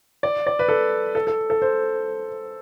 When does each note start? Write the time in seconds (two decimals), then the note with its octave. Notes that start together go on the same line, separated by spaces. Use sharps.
0.23 D5
0.47 D5
0.59 B4
0.68 A4
1.15 A4
1.27 A4
1.50 A4
1.62 C5